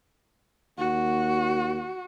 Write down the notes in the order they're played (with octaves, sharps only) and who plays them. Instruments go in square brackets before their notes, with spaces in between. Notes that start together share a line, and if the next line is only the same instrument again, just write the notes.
[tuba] D#2 [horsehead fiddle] F#4